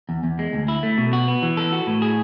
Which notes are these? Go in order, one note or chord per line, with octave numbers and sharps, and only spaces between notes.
E2
E2
G#3
D2
E4
A3
B2
F#4
B3
E3
A4
F#4
A2
G#4